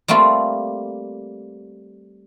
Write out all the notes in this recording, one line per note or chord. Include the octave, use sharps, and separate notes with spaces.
G3 A3 A#3 C4 F4